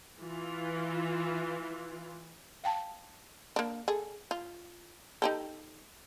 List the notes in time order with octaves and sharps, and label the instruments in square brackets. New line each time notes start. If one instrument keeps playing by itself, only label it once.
[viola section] E3 F4
[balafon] F5 G5 A5
[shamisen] A#3 D4
G#4 A4
F4
D#4 G4 A4